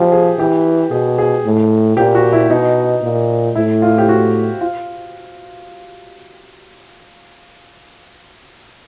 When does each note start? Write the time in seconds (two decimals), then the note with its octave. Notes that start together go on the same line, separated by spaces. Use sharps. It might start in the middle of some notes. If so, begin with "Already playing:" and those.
Already playing: F3 G4
0.12 G#4
0.38 E3 G4
0.91 B2 G#4
1.18 G#4
1.45 A2
1.97 A#2 G4
2.15 F#4
2.33 E4
2.50 B2 D#4
3.02 A#2
3.55 A2 E4
3.82 F4
3.98 G4
4.09 F#4
4.61 F4